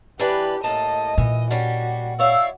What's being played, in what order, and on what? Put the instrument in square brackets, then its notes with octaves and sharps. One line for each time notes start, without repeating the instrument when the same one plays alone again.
[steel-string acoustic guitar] E3 D4 B4 [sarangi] G4
[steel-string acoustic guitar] A2 A#3 A5 [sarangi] D#5
[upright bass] A#2 [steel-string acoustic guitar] E3
[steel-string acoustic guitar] G3 C#4 D4 [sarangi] F#4
[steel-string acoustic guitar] E4 C#5 D5 [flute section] F5 E6